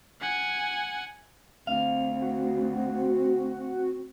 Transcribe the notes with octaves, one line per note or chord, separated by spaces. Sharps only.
F#5 G#5
D2 C4 F5
F#4